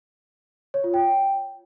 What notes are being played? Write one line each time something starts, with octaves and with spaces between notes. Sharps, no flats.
C#5
F4
G5